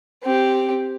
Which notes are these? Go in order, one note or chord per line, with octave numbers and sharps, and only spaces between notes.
C4 G4